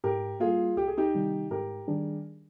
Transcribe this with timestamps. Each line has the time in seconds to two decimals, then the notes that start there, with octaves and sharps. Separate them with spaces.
0.04 G#2 G4 A#4
0.40 G3 A#3 F4 G#4
0.77 C2 G4
0.88 G#4
0.97 D#4 G4
1.14 C3 D#3 G3
1.50 G#2 G4 A#4
1.88 D#3 G3 D4 G#4